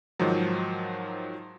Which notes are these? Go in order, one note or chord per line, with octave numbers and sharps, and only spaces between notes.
G#2 D#3 F3 F#3